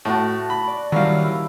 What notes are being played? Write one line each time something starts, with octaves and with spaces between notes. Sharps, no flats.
A2 F#4 F#5 A5
B5
D5
D#3 F#3 G3 C#4 E4 G4 F5
E4